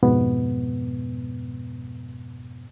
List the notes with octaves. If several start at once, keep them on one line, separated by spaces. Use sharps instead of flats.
F2 G#2 B2 B3